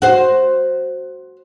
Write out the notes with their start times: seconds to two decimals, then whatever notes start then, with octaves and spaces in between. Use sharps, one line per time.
0.02 F#4 C5